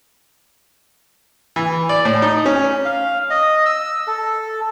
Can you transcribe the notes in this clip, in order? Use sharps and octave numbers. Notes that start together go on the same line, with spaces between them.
E3
D5
A2
D#4
C#4
F5
D#5
E6
A4